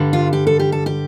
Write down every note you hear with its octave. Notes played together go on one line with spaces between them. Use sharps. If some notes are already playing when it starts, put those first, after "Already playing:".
Already playing: G2 D3 G3
F4
G4
A4
G4
A4
G4